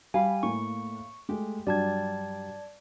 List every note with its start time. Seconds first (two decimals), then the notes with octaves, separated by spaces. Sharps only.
0.14 G3 F5 G#5 B5
0.43 A2 A#3 C#6
1.29 G#3 A3 G4
1.67 G2 F#3 G3 D5 A5 G#6